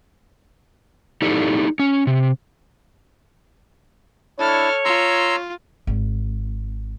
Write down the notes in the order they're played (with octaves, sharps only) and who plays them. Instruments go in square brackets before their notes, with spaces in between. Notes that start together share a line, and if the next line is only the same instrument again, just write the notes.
[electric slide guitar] D#4 E4 G4 A4 D5
C#4
C3
[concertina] D4 E4 [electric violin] A4 F6 [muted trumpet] C#5
[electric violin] F4 [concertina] A#5 C6 E6
[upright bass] G#1